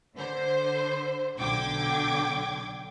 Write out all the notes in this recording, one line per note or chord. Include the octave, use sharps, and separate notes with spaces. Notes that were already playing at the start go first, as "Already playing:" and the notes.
D3 C5
B1 D3 G5 D6 G#6